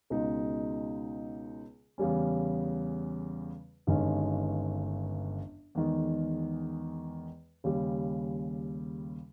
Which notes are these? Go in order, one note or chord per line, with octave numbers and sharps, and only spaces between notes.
C#2 B2 G#3 D#4
E2 C#3 G3 C#4
G1 G2 D#3 G#3 C#4
E2 D#3 G#3
D#2 C#3 G3